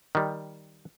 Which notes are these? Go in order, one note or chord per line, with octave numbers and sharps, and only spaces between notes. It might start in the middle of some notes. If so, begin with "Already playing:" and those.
D#3 G3